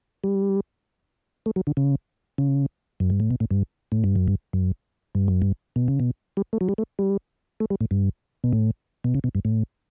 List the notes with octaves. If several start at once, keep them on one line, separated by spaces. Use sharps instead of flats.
G3
A3
F#3
D3
C#3
C#3
F#2
G2
A2
B2
A2
G2
A2
G2
F#2
G2
F#2
G2
F#2
G2
B2
C#3
B2
G3
A3
F#3
G3
A3
G3
A3
G3
A2
G2
B2
A2
B2
C#3
B2
G2
A2